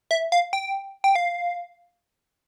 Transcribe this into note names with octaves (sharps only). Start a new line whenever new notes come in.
E5
F5
G5
G5
F5